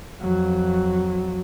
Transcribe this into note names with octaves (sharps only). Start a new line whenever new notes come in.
F2 F#3